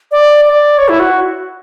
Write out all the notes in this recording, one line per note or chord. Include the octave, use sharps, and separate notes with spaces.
D5
D5
C#5
E4
F#4